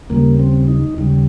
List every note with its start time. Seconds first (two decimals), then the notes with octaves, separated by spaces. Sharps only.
0.10 D#2 C#3 G3 A#3
0.40 C4
0.68 D#4
0.97 D#2 C#3 G3